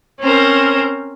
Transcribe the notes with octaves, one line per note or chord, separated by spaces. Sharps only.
C4 C#4 A#4 C5